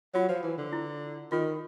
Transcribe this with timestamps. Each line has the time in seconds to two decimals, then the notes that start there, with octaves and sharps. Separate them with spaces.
0.14 F#3 F4
0.29 F3
0.43 E3
0.58 D3
0.73 E4
1.32 D#3 F4